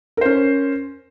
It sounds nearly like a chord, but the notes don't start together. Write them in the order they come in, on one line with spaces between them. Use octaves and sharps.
A#4 C5 C#4